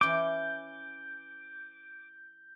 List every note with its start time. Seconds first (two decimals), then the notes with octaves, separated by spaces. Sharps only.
0.01 E3 C#4 D6 G6